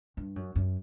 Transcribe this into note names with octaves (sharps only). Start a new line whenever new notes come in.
G2
F#2
F#2